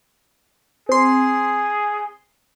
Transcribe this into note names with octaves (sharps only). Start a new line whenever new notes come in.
C4 G#4 C6